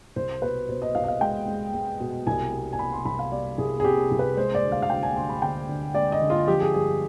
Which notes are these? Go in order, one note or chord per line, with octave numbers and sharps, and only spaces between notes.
C2 C5
B2 B4
B2 C5
D#5
C2 F5
D#5
F5
G#3 G5
G#3
G#3
B2
C2 G#5
G3
G#5
C3 B5
C6
C2 B5
F5
G3 D5
C2 G#4
G#4
C3 G4
C2
B4
G#3 C5
D5
D2
F5
F5
D2 G5
G#5
D2 C6
B5
D3 G5
D3
G#3 D5
D#5
D3
F4
F3 G4
G#4
G2 G#4